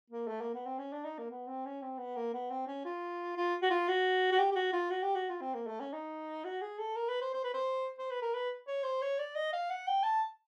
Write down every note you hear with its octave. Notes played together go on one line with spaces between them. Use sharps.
A#3
A3
A#3
B3
C4
C#4
D4
D#4
A#3
B3
C4
C#4
C4
B3
A#3
B3
C4
C#4
F4
F4
F#4
F4
F#4
F#4
G4
G4
F#4
F4
F#4
G4
F#4
F4
C4
A#3
A3
C#4
D#4
F#4
G#4
A4
A#4
B4
C5
C5
B4
C5
C5
B4
A#4
B4
C#5
C5
C#5
D5
D#5
F5
F#5
G5
A5